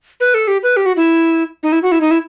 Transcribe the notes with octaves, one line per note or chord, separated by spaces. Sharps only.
B4
A4
G4
B4
G4
F#4
E4
D#4
E4
F#4
E4
D#4
E4